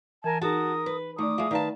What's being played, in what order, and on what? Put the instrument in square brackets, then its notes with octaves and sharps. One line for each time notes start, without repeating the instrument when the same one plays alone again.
[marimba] E3 [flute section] A#4 G#5 A5
[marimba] D#4 G#4 [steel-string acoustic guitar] F#4 A5 [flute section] A#4 D#6
[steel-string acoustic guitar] B4
[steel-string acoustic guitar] D#3 [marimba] A3 D5 [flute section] D6 D#6
[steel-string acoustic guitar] F3 G#3 [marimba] E5
[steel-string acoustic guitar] D#3 B4 A5 [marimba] D5 F5 A#5